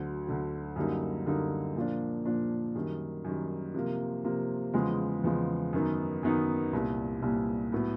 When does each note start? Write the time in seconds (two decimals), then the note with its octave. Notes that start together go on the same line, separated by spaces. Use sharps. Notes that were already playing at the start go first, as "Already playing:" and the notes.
Already playing: D2 D3 F#3
0.27 D2 D3 F#3
0.76 F#2 D3 G3 A#3 D#4
1.26 F#2 D3 G3 A#3 D#4
1.76 A#2 F3 A#3 D4
2.26 A#2 F3 A#3 D4
2.75 F#2 D#3 G3
3.24 F#2 D#3 G3
3.74 C3 F3 A#3
4.24 C3 F3 A#3
4.74 E2 C#3 F3 G#3
5.24 E2 C#3 F3 G#3
5.73 F#2 D#3 F#3 B3 D#4
6.23 F#2 D#3 F#3 B3 D#4
6.73 C2 A#2 G3
7.22 C2 A#2 G3
7.72 A2 F#3 B3